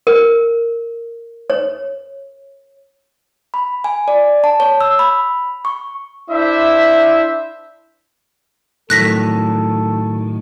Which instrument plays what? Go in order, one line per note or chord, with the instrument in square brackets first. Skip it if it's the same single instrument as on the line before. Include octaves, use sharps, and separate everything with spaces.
[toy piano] A#4
C#5
[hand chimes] B5
G#5
D5
A5
C#5
E6
B5
C#6
[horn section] D4 E4 C5 E5
[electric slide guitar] A2 D#3 F#3 [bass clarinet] A4 [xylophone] F#6 A#6 B6